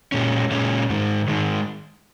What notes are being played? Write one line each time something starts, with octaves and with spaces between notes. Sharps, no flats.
A#2 G#3 C#4
A#2 G#3 C#4
G#2 D#3 G#3
G#2 D#3 G#3